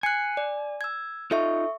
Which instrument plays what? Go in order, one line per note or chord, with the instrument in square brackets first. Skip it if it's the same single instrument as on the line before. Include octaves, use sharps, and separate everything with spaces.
[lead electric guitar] G#5 [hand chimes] F#6 C7 C#7
[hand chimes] D5
E6 G#6
[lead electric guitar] D#4 F4 [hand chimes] A4 E5 C#6